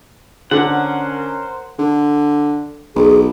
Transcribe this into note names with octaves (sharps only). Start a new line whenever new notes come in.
D3 C#4 A#4 C5 F#5
D3
B1 G#4